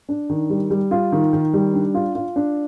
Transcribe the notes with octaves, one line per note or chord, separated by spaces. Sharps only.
D4
D#3
G3
G3
F4
D#3
D#3
G3
D4
F4
F4
D4